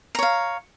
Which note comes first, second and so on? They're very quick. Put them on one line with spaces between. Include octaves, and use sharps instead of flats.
A#5 C#5 F5